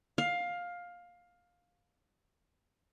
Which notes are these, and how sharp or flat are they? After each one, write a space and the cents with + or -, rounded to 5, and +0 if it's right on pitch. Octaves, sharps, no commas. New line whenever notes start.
F5 +15